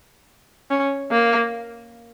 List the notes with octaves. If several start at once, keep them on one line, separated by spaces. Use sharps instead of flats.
C#4
A#3